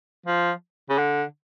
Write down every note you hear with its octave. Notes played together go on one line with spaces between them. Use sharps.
F3
C#3
D3